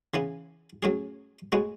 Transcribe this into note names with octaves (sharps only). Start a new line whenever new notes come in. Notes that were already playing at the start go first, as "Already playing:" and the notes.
C#3 E3 B3
A2 F#3 C#4 G#4
A2 G#3 B3 F#4